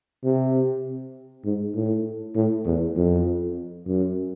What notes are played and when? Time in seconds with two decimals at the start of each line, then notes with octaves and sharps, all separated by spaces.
0.24 C3
1.45 G#2
1.75 A2
2.36 A2
2.66 E2
2.96 F2
3.87 F#2